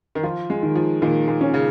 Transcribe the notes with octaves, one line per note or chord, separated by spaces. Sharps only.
D#3
F3 F4
G#3
D#3
F3
A#2 D#3
A#2
C#4
C#3